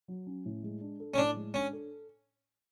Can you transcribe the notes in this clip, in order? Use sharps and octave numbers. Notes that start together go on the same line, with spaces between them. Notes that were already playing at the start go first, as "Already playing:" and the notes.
F#3
C#4
A2
G#3
D4
A4
C#4
A2 D4
G#3
C#4 D4
A4